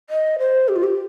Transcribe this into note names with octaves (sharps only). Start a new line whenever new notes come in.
D#5
C5
G4
F4
G4